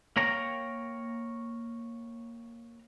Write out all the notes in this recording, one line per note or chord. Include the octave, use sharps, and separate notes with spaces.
A#3 A#4 C#5 G5 A#5